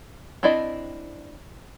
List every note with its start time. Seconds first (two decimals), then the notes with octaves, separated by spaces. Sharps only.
0.43 C4 D4 E4 D5 D#5